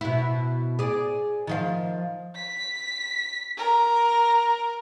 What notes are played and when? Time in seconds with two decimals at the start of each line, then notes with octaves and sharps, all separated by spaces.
0.01 B2 E4
0.79 G#4 D5
1.47 D#3 F3 F5
2.36 B6
3.57 A#4